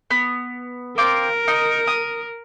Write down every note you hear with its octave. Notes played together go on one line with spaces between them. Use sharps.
B3
C4 F4 A#4 D6
D#4 D#6
D#6